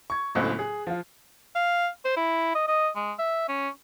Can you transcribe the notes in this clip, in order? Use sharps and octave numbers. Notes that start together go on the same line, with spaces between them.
C#6 G#6
D1 C#2 A2 A#3 C4 F#6
G#4
F3 F4
F5
C5
E4
D#5
D#5
G#3
E5
C#4